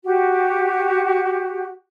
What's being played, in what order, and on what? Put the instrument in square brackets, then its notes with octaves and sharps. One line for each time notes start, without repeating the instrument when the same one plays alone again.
[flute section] F#4 G4